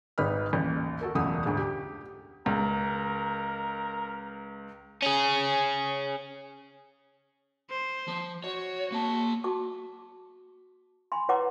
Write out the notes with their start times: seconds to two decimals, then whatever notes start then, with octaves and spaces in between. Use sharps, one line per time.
0.18 G#1 G#2 D#4 B4 B5 F6
0.53 A1 D#2
1.01 F#4 A4 A#4
1.15 E1 C#2 F#2 A3 F#5 D#6
1.46 D2 G#2
1.57 G4
2.46 C#2 A#4
5.02 C#4 G#4
7.70 C5
8.08 F3
8.44 F#4 C#5
8.92 A#3 A5
9.44 F#4 A5 D6
11.12 G#5 B5 C6
11.29 E4 B4 C#5 F#5 A#5 D6